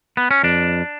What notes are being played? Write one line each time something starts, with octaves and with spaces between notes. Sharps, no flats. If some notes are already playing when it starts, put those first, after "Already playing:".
B3
C#4
F2 D4